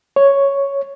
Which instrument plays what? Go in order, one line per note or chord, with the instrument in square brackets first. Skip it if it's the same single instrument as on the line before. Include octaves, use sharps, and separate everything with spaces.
[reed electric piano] C#5